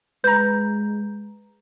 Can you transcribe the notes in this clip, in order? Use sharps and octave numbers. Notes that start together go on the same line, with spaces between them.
G#3 B4 A#5 G6